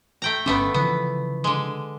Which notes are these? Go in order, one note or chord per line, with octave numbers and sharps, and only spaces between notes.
A3 G5 A#5
G1 D3 A3 B3 C#4
C#3 E3 F3 B3
D3 G#3